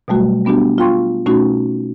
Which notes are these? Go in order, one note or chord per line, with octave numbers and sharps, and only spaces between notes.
B2 F#3 G3 A3 F#4
G3 B3 D4 F#4 G4
F4 F5 G5 C6 C#6
B2 A3 C#4 D#4 F#4